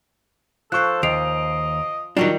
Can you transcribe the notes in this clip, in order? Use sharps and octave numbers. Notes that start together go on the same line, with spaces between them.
F3 A4 C5 C#6 F#6
D#2 D#5 C7 D7 F7
D#3 F#3 G3 D4 F4